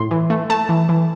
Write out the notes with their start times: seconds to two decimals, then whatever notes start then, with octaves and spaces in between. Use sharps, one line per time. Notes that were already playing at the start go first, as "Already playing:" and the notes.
Already playing: A2 C6
0.11 E3
0.30 A3
0.50 A3 A5
0.69 E3
0.89 E3